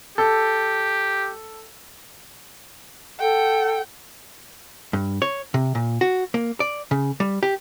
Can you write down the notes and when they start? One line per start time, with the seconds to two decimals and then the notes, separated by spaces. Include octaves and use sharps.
0.18 G4 A4
3.19 A4 F#5 G5
4.93 G2
5.22 C#5
5.54 C3
5.75 A#2
6.01 F#4
6.34 A#3
6.60 D5
6.91 C#3
7.20 G3
7.43 G4